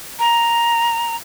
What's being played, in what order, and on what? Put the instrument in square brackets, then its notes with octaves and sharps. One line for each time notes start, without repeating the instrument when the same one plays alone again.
[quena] A#5